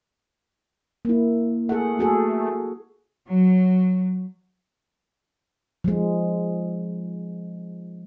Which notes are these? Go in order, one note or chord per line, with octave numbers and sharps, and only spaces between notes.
A#3 E4
A3 G#4 F#5
F#4 G#4 A4
F#3
F3 G#3